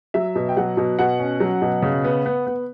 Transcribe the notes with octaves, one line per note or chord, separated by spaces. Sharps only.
F#3 E5
B2
G5
F#3 F#5
B2
B2 F#5
C#4
F#3
B2
C#3
B3
B3
B3